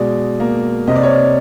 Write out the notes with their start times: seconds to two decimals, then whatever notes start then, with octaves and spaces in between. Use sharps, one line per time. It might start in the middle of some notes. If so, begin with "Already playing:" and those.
Already playing: B2 G#3 D5
0.40 A#3
0.87 C3 D#5
0.96 D5
1.03 C#5
1.10 D5